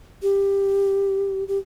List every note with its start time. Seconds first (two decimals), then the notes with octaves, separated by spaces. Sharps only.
0.22 G4
1.48 G4